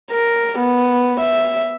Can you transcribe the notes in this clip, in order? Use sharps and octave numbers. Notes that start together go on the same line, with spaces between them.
A#4
B3
E5